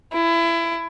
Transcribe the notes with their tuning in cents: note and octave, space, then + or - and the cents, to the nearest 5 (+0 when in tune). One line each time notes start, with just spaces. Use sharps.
E4 +25